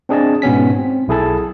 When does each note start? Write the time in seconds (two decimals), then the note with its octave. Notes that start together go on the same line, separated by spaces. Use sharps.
0.09 C4 D4 G#4 D#5 A5
0.42 G#2 B2 B3 C#4 B6
0.79 C4
1.08 B1 E4 G#4 A4 A5